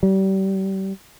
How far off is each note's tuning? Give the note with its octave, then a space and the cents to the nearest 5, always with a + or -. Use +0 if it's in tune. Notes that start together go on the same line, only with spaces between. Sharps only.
G3 -30